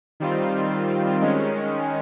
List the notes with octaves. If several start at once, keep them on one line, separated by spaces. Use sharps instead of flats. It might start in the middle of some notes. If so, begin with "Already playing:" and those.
D#3 G3 C4 F4
D#3 G#3 C#4